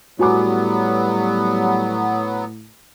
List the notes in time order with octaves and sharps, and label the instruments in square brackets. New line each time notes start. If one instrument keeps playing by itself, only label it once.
[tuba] A2 [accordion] F#3 B3 [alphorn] G3 [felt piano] F#4 G#5 D6